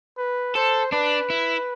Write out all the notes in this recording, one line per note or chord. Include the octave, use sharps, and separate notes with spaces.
B4
A4 C5
D4 B4
E4